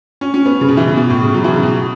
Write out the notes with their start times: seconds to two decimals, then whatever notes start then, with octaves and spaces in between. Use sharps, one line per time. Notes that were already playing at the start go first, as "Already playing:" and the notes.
0.21 C#4
0.34 C#4
0.46 B3
0.61 C#3
0.69 B2
0.77 E3
0.87 C#3
0.97 B2
1.10 A2
1.22 C#3
1.34 F#3
1.44 E3
1.54 C#3
1.63 B2